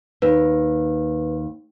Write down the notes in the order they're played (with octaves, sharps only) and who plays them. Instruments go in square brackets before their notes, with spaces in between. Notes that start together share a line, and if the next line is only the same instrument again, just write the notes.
[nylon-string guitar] D#2 [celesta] B4